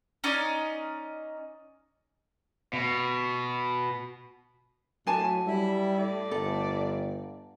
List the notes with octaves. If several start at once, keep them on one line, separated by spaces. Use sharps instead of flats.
C#4 D#4 D5 D#5
B2
A2 F#3 D4 G#5 A5
G3 E4
A2 D5
G1 A4